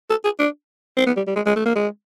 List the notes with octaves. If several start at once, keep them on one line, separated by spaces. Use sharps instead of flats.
A4
G#4
D4
C4
B3
G3
G3
G#3
G#3
A3
A#3
G#3